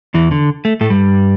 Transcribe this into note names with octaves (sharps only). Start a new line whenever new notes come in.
E2 E3
D3
A3
A2 A3
G2 G3